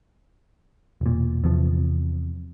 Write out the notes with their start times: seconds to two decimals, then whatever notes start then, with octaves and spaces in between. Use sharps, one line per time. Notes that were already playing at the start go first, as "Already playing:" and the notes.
1.01 E1 A#2
1.44 E2 C3 F3